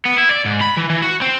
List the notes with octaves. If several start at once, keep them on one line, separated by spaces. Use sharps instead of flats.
B3
E4
D5
G#2
B5
E3
E3
F#4
C4